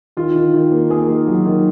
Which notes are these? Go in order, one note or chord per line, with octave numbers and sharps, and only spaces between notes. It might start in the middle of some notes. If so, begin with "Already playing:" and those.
D#3 F4
D#3
D#3
A#3
A#3 G#4
D#3
F#3
D#3